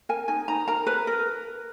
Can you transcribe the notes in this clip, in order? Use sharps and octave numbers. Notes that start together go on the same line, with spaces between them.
A#4 G#5
D#4 G#5
D#4 A#5
A#4 A#5
A#4 B4
A#4